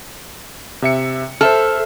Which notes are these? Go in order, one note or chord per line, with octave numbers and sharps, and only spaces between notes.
C3 E5 C#7
A4 C5 E5 F6